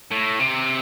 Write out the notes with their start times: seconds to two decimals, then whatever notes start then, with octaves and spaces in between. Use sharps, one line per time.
0.11 A2
0.39 C3